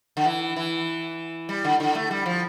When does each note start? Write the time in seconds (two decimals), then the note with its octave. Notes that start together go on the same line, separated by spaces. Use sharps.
0.17 D3
0.25 E3
0.56 E3
1.49 G3
1.65 D3
1.80 D3
1.95 A3
2.11 G3
2.26 F3